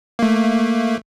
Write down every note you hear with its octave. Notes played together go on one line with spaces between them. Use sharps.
A3 A#3